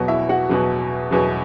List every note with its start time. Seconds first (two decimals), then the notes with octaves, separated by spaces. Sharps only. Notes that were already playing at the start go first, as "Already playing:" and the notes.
Already playing: E2 B2 F#3 F#4
0.08 E4 E5
0.29 F#4 F#5
0.49 E2 B2 F#3
1.11 E2 B2 F#3